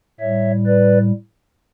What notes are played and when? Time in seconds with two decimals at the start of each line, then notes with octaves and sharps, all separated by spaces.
0.20 A2 G3 C#5 E5
0.66 B4 D5